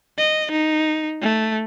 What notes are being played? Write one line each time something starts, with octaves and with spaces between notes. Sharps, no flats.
D#5
D#4
A3